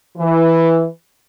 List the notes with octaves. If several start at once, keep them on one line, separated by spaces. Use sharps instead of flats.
E3